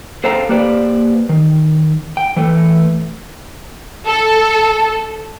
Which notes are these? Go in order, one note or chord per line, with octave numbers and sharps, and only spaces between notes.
G#4 A4 C5 F5 G5 A#5
A#3 G4 B4 C5 D5
D#3
G5
E3 A3 B4
A4